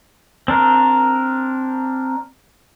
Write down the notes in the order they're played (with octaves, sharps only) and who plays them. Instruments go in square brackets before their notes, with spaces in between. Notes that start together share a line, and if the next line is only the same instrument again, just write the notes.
[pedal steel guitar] C4 D4 A#4